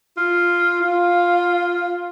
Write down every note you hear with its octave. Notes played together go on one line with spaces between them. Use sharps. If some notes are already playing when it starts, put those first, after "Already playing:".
F4
F4 F5